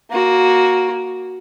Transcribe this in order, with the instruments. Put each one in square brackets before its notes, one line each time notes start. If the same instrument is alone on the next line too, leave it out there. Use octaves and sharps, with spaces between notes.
[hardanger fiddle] A#3 F#4